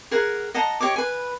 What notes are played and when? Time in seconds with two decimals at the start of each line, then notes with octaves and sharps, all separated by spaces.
0.11 G#4 A#4 F#5
0.54 D#5 F#5 A5 A#5
0.80 G4 C#5 D#5 D6
0.96 B4 G#5